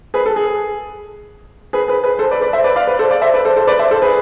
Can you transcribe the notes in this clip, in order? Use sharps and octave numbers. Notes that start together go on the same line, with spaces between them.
G#4 B4
A4
G#4
G#4 B4
G#4 B4
G#4 B4
A4 C5
B4 D5
B4 D5
C5 E5
B4 D5
D5 F5
B4 D5
A4 C5
D5 F5
C5 E5
B4 D5
A4 C5
A4 C5
B4 D5
C5 E5
A4 C5
G#4 B4